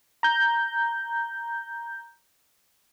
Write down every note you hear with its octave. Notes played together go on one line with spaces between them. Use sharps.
A#5 G6